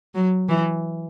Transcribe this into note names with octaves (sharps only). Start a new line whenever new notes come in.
F#3
E3